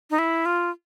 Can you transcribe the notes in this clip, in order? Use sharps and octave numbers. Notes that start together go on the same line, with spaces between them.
D#4
E4
F4